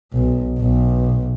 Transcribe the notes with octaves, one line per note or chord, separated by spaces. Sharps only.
B1
B1